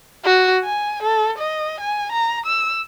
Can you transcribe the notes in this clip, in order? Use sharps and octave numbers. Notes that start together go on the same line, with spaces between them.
F#4
G#5
A4
D#5
G#5
A#5
E6